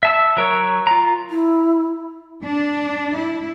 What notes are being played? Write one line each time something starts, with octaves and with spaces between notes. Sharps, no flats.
E5 A5 E6
F#3 A#4 C#5
F4 A#5
E4
D4
E4